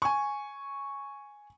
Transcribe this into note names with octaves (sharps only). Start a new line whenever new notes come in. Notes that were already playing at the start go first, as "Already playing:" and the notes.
G#5 C#6